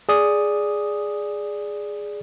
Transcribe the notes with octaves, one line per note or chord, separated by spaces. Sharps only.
G#4 D5 D#6